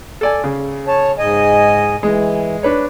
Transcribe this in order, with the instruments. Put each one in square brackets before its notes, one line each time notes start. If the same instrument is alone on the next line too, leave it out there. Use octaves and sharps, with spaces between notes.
[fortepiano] A4 D5 G#5
C#3
[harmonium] C#5 A5
G#2 D#5 G#5
[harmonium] E3 [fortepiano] G#3
[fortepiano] D4 B4 C#5